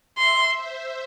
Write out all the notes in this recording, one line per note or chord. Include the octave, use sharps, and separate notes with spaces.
E5 C6
C5